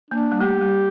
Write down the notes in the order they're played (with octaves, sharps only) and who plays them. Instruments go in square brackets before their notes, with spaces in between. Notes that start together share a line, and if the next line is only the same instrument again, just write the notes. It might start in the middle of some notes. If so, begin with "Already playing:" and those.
[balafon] A#3 [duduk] D4
[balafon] G3
[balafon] A3 [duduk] G4
[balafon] G3